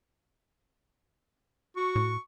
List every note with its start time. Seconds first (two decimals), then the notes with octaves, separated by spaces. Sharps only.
1.76 F#4 C#6
1.96 A2